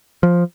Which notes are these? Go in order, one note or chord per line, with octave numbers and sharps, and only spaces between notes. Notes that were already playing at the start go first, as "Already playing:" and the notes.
F3